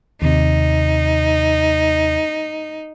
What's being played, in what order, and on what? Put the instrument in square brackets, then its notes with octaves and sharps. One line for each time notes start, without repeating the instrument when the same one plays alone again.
[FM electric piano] D#2 C3 [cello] D#4